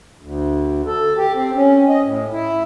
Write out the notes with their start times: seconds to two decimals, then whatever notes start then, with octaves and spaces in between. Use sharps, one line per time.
0.21 D2
0.87 A4
1.17 G4
1.35 C4
1.55 C#4
1.89 D#5
2.04 A2
2.32 E4